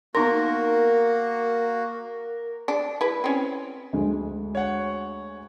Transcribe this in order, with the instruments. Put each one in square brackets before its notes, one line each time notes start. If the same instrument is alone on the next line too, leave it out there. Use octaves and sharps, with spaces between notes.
[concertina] A#3 F#4 [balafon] B3 D#4 C6 [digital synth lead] A#4
[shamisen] D4
E4 B4
C4 C#4
[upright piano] D2 G#3
[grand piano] C#5 F#5